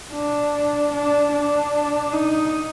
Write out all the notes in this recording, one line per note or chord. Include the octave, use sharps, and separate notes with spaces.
D4
D4
D4
D#4